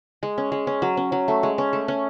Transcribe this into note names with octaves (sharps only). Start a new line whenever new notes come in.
G#3
C#4
G#3
C#4
F#3
C#4
F#3
A3
G#3
C#4
A3
C#4